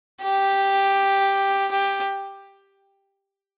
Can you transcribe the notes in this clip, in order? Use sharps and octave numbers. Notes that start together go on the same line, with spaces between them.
G4
G4